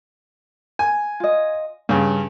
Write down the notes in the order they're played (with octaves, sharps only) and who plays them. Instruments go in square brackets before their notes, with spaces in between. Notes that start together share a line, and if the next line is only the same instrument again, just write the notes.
[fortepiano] G#5
[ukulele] F4 D#5
[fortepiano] G2 C#3 [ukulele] C#4